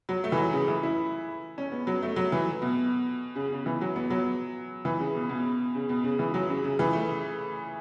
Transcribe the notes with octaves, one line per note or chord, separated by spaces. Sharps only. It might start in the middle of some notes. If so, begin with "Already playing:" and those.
F#3
A3
E3
F#3
C#3
E3
E4
C#4
B3
F#3
A3
F#3
E3
B2
C#3
C#3
E3
F#3
B3
F#3
E3
C#3
B2
B2
C#3
B2
C#3
E3
F#3
C#3
C#3
E3
A3